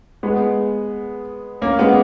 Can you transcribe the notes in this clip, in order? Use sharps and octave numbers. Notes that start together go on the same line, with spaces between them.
G#3 B3
A#3 C#4
G#3 B3